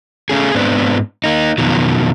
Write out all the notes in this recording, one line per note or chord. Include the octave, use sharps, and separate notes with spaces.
A3 C#4 G#4
G#2 B3 C4 D4
A#3 D#4
F2 B2 D#3 F#3